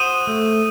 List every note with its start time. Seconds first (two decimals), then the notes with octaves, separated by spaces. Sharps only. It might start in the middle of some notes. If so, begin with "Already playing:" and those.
Already playing: F#4 C5 D#6 D#7
0.27 A3